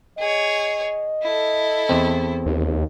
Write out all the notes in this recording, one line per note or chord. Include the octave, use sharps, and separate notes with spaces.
G#4 C#5 D#5
E4 A4
E2 C4
D#2